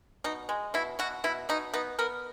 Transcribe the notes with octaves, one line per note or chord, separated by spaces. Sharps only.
B2 D#4
G#3
B2 E4
B2 F#4
B2 E4
B2 D#4
B3 D#4
B3 A#4